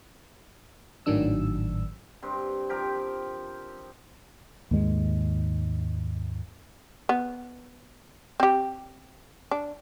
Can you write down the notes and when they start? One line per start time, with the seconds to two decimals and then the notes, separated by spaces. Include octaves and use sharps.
1.06 G#1 A2 D#3 F#3 D4 E6
2.22 G2 C4
2.69 F3 G4 A#4 G5
4.71 D#2 G#2 D#3 G#3
7.09 B3
8.40 C4 G4
9.51 D4